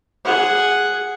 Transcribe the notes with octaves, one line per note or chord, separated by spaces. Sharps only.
G#4 F#5